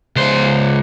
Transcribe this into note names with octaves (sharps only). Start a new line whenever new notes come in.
C#2 C5